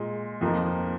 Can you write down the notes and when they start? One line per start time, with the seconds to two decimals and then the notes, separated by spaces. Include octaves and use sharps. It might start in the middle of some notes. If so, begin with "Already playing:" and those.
Already playing: A#2 G#3
0.41 F2 F3 A#3 D#4